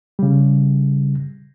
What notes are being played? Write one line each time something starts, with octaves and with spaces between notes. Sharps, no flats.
C#3 G3